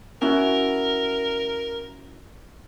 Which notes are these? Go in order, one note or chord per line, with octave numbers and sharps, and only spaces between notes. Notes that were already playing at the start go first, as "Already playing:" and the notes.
C#4 E4 F#4 A#4